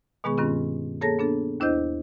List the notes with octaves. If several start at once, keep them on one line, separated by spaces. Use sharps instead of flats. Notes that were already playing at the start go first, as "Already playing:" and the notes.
B2 D#3 G#3 B3 G#4 C#6
G2 D#3 C4 C#4 F4
A#3 G#4 A4 C#5 A5 A#6
B3 D4 A4
D#2 D4 E4 C5 D#5 G6